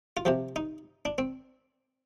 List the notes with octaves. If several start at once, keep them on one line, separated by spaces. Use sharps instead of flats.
F4
C3 F3 G4
D#4
D4
C4